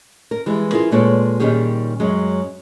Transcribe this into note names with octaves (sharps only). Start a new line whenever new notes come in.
A#4
E3 G3 G#3
E4 F4 G#4 A#4
A#2 G#3 A4 B4 C#5 D5
A#2 D#3 G3 C#4 G4 G#4
F#2 F#3 G#3